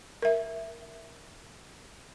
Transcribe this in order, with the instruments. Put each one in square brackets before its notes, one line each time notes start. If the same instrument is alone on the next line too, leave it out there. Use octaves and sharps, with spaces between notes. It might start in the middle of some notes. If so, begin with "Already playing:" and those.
[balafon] A#4 E5